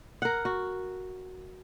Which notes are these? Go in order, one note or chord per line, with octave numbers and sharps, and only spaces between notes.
A#4 F#5
F#4